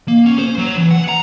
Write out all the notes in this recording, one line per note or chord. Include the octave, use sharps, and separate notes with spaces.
A#3
C#4
C5
F#3
E3
F#5
A#5